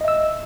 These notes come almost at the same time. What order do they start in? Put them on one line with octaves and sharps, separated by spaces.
D#5 E5 E6